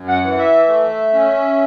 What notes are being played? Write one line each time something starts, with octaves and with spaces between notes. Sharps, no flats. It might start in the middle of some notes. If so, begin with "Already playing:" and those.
Already playing: F#2
F#5
E3
E5
A3
C#4